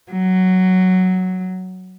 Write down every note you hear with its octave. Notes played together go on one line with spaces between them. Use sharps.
F#3